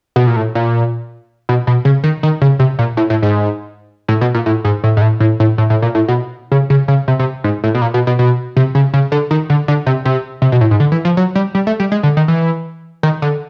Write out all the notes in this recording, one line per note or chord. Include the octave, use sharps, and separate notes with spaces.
B2
A#2
A2
A#2
B2
B2
C#3
D#3
D#3
C#3
C3
A#2
A2
A2
G#2
A2
B2
A#2
A2
G#2
A2
G#2
A2
A2
A2
A2
A2
A#2
A2
B2
C#3
C#3
C#3
C3
C3
G#2
A2
B2
A#2
B2
B2
B2
C3
C#3
C#3
D3
D#3
D3
D3
C3
C3
C3
B2
A2
G#2
D3
E3
F3
F#3
G3
G3
A3
G3
G#3
D3
D#3
E3
D#3
D3